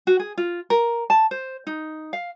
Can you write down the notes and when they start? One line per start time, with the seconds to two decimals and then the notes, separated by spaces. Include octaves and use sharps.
0.07 F#4
0.19 G#4
0.38 F4
0.70 A#4
1.10 A5
1.31 C5
1.67 D#4
2.13 F5